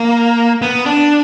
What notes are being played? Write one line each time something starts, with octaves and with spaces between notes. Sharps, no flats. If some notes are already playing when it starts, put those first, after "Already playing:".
Already playing: A#3
B3
D4